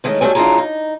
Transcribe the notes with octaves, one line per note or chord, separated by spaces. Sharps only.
D#3 E3 G#3 A3 C#4
G#2 F#3 G3 A3 A4 G#5
F#2 D4 E4 F4 G#4 A#5
D#4